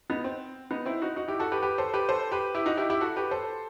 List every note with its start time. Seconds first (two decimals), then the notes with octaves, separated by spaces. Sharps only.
0.10 B3 D#4
0.24 C4
0.71 B3 D#4
0.86 C4 E4
1.02 D#4 F#4
1.16 D#4 F#4
1.28 E4 G4
1.40 F#4 A4
1.52 G4 B4
1.62 G4 B4
1.78 A4 C5
1.94 G4 B4
2.09 A4 C5
2.32 G4 B4
2.55 E4 G4
2.66 D#4 F#4
2.77 E4 G4
2.90 E4 G4
3.01 F#4 A4
3.16 G4 B4
3.31 A4 C5